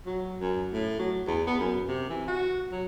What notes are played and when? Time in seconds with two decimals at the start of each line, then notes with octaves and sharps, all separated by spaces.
0.06 F#3
0.40 F#2
0.73 A2
0.99 F#3
1.27 E2
1.47 B3
1.59 F#2
1.88 C3
2.10 E3
2.28 F#4
2.72 F#3